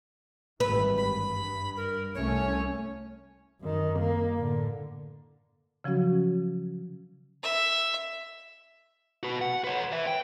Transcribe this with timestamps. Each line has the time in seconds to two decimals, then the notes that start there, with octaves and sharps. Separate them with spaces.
0.60 G#1 E3 G3 B4 B5
0.97 G2 B5
1.77 A#4
2.15 C2 A3 C#4 C#5
3.61 F#2 D#3
3.99 A#3
4.37 A2 D3
5.84 C#3 F3 F#3 C#4 F#4
7.43 E5
9.23 F#4 B4
9.41 F#5
9.64 B4 C#5
9.92 B4 E5
10.07 G5